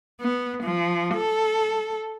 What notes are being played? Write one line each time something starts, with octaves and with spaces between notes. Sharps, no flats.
B3
F3
A4